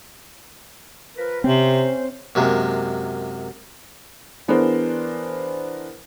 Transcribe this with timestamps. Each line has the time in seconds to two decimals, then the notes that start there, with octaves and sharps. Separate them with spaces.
1.17 F3 A#4 B4
1.44 C3 C4 C#4 C5
2.35 F#2 C3 G#3 A#3
4.48 E3 B3 D4 G#4 A#4 C5